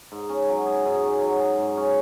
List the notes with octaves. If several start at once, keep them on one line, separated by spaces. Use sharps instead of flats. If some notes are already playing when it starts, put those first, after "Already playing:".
G#2
C#4
F#3
G#4
G#2
C#4
F#3
G#4
G#2
C#4